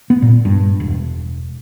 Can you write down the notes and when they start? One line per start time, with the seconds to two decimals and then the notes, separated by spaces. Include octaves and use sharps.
0.10 B3
0.22 A#2
0.45 G2
0.80 E1